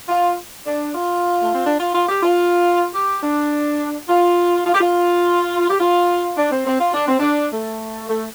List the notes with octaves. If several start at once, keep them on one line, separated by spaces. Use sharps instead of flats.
F4
D4
F4
A3
C4
D4
F4
F4
G4
F4
G4
D4
F4
F4
G4
F4
G4
F4
D4
C4
C4
F4
D4
C4
D4
A3
A3